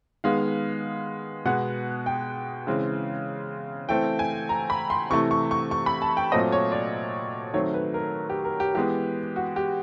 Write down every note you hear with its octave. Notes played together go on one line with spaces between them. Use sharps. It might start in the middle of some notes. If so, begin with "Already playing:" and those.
D#3 G#3 B3 F5
B2 G#3 B3 F#5
G5
C#3 E3 G#3 C4
E3 A3 C4 G5
G#5
A#5
B5
C6
C3 E3 A3 C#6
C#6
C#6
C#6
B5
A5
G5
A#2 F#3 A3 C4 D#5
C#5
D5
D#3 F#3 A3 C4 C#5
B4
A#4
G4
A#4
G4
E3 G#3 B3 G4
F#4
G4